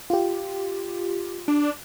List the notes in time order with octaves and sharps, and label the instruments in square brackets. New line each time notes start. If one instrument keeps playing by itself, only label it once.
[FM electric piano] F4 G4
[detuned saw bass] D4